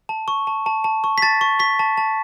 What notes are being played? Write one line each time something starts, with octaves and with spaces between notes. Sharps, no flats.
A5
C#6
A5
A5
A5
C#6
B6
A5 A6
C#6
C#6 B6
A5
A5